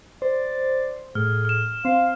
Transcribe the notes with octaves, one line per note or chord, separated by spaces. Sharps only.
C5 D5
A2 G#4 F6
F6 E7
C4 F5